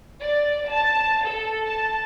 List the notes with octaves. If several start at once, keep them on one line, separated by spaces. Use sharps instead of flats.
D5
A5
A4
A5